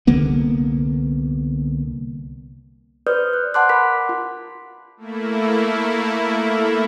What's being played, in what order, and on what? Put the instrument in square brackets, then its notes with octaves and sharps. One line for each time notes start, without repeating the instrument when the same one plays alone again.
[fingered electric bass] C2 D3 A#3 B3
[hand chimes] B4 C5 D5 D#6 F6 G6
F#6
F#5 A5 C6 D6 F#6
A#4 B5 D6 B6
F4
[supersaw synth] A3 A#3 E4